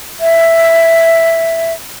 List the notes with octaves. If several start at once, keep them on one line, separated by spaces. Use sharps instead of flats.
E5